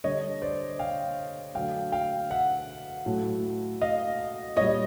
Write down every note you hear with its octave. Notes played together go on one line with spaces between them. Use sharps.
D3 G3 C#5 D#5
C5 D5
F5 G5
D3 F#3 A3 F5 G5
F5 G5
E5 F#5
A2 F#3 A3
D#5 F5
A#2 G3 C#5 D#5